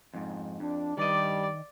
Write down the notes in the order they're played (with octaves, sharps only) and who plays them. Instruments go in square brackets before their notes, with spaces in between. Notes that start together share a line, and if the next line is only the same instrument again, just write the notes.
[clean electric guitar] F2 G#2
[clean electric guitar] F2 [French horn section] D4
[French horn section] G2 G3 [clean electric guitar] D#3 D#5 [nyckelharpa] D5